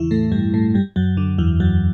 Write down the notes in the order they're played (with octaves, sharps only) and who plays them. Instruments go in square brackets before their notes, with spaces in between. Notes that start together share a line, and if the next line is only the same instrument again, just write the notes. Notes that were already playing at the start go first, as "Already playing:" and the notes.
Already playing: [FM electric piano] E2 C#3 E3 E4
A2 A3
G2 G3
A2 A3
G2 G3
F#2 F#3
D3
E2 E3
F#2 F#3